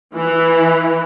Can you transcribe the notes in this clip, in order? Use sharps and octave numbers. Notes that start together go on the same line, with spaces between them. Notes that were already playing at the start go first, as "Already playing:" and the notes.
E3